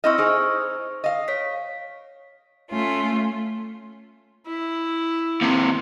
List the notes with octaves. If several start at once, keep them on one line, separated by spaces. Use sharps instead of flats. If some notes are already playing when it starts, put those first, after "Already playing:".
C4 E4 D#5 C#6 E6 F6
D#4 G#4 C5 F6
D#5 F5
C#5 B6
A3 C#4 F4
E4
D#2 C3